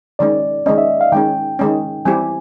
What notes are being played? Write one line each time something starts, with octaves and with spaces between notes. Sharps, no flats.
D#3 G#3 C#4 D5
D#3 G#3 C#4 D#5
E5
F5
D#3 G#3 C#4 G5
D#3 G#3 C#4
E3 G3 C4 E4 G4 G#5